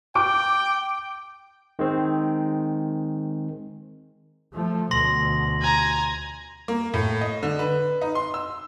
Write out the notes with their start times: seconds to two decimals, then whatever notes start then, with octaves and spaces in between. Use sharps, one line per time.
0.15 G5 D6
1.79 D#3 G#3 C4
4.53 F3 A3
4.91 D2 B2 C6 A#6 F#7
5.61 G#5 A#5
6.68 A#3
6.94 A2
7.21 D#5
7.43 D3
7.59 B4
8.01 D#4
8.15 C6
8.34 E6